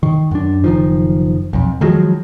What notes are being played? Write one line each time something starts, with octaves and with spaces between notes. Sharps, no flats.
D#3
F#2 D4
F#1 D#3 F3
B1 F2
D#3 F3 F#3 G#3